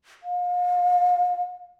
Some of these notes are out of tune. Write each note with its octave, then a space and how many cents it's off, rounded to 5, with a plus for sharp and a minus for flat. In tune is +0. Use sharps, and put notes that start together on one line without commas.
F5 +35